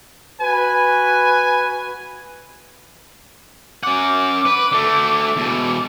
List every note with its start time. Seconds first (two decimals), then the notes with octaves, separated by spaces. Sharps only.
0.41 F#4 B4 G#5
3.83 C#4 F#5 D6
4.45 B4
4.72 D3 A3
5.36 E2 B2